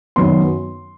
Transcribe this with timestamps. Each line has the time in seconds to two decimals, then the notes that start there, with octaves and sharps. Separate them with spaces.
0.16 F#2 D#3 F#3 B3 C6